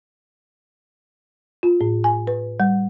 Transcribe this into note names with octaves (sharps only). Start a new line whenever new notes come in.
F4
A2
G#5
B4
G3